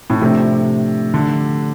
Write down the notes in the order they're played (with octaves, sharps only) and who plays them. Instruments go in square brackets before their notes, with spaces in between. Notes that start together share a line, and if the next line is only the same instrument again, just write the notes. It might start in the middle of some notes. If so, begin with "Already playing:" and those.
[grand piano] A2
[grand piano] C3 [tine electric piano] F3 A3 D4 G4
[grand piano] D3